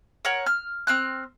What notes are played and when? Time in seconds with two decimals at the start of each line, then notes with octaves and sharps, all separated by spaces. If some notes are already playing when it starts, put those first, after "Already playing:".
0.25 A#4 C#5 F#5
0.46 F6
0.87 C4 F6 F#6